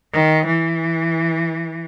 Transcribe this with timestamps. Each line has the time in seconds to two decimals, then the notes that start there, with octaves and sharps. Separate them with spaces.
0.13 D#3
0.46 E3